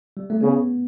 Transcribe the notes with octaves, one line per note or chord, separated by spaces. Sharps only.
G3
A3
C#3 B3